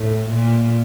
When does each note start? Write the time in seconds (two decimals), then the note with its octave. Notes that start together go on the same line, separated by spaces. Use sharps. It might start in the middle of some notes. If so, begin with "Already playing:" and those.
Already playing: A2
0.28 A#2